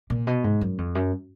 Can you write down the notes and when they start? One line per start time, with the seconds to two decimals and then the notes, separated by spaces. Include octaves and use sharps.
0.10 A#2
0.27 B2
0.44 G#2
0.61 F#2
0.78 F2
0.95 F#2